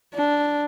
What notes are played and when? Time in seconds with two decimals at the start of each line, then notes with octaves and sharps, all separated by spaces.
0.14 D4